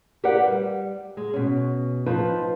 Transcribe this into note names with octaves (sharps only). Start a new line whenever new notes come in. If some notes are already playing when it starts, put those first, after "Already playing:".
G4 A#4 B4 D5 F5 F#5
G3
G#3
B2 C#4
F3 D#4 F4 B4